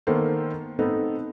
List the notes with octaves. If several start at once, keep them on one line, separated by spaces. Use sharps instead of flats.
D#3 A#3 B3 A4 C5
A3 B3 C4 D#4 A4